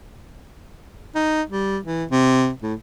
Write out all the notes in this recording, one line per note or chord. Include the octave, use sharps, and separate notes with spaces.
D#4
G3
E3
C3
A2